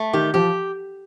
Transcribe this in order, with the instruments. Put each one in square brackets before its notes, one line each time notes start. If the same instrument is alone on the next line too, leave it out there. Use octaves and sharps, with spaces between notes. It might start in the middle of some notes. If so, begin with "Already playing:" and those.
Already playing: [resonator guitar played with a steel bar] A3
[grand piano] D#3 [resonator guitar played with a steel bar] G4
[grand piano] F3 [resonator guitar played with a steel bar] G4